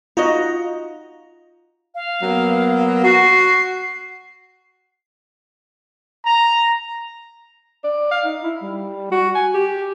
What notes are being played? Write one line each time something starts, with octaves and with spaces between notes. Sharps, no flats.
D#4 F4 F#4 D#5
F5
F#3 A#3 B3
F#4 C7
A#5
D5
F5
D#4
E4
G3
F#4
G#5
G4